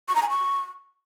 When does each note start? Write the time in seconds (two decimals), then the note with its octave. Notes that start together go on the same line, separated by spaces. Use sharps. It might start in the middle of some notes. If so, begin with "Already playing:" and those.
0.08 C#6
0.15 A#5
0.22 G#5
0.29 C#6